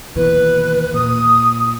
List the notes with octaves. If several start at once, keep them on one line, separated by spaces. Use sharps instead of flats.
D#2 B2 E3 B4
A#2 D#6